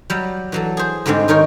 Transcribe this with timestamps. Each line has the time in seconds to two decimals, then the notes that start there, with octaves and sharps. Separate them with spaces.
0.10 F#3 G3
0.52 E3 F#3 A4
0.77 G#4 C5
1.06 G#2 D3 G3 G#3 C4
1.28 D#3 D#4 A#4 C#5 G5